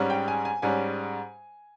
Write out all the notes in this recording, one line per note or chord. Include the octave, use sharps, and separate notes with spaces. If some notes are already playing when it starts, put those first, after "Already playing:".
Already playing: G#2 G3 C#4
G5
G#5
G#5
G#2 G3 C#4 G#5